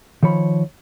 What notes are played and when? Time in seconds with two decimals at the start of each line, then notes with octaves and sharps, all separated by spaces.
0.23 D#3 F3 C#5 B5